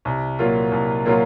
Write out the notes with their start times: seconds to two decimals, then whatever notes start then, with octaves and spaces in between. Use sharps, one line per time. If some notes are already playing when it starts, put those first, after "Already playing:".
0.05 C2
0.39 A#2 F#3 A#3 F4
0.72 C2
1.06 A#2 F#3 A#3 F4